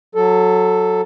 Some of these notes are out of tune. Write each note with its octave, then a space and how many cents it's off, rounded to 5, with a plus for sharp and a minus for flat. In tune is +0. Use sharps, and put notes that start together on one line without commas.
F#3 -10 A4 +0